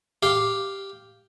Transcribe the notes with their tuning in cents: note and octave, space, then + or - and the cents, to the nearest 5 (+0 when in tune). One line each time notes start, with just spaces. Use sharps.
G4 +0 F5 +0